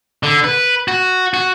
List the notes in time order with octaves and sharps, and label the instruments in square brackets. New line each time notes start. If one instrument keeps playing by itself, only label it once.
[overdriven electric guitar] D3
B4
F#4
F#4